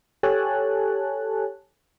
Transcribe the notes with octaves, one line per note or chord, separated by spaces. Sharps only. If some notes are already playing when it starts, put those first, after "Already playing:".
G4 A4 C#5 G#5 A5 F#6